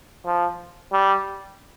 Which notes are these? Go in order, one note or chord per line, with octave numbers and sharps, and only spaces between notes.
F3
G3